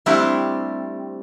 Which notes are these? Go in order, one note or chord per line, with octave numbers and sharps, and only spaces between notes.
G3 A3 C4 D4 E4 G4